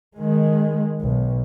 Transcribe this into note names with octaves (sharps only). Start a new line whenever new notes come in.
D#3 G#3
B1